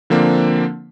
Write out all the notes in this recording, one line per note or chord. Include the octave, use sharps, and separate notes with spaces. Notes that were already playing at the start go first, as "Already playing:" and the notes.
D3 F3 A#3 C4 D4